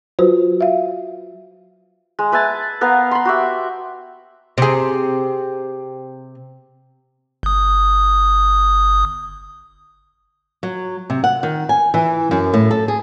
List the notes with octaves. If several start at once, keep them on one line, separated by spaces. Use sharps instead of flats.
F#3 F4 F#4 B4 C5
E5 F5
G#3
B4 E5 G#5 A5
B3 A#4 F5
B5 C6
F#4 G4 E5
C3 G#4
G1 D#6
F#3
C3
F#5
D#3
G#5
E3
F#2
A2
A4
G#4